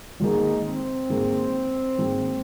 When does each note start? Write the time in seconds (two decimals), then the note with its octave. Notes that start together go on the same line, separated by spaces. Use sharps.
0.20 G#1 G#2 D#3 A#3 D#4 G#4
0.64 C4
1.09 G#1 G#2 D#3 A#3 G#4
1.98 G#1 G#2 D#3 A#3 G#4